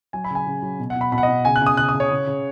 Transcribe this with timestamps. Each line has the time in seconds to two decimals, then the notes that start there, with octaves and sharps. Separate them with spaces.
0.13 F#3 G#5
0.24 B5
0.30 C#3 G#5
0.47 C#3
0.62 F#3
0.79 B2
0.90 F#5
0.96 B2
1.01 B5
1.12 B2 B5
1.18 F#5
1.23 D#5
1.28 B2
1.45 C#3 G#5
1.56 F#6
1.61 C#3
1.66 D#6
1.77 C#3 F#6
1.89 D#6
1.94 C#3
2.00 C#5
2.11 C#3
2.27 C#3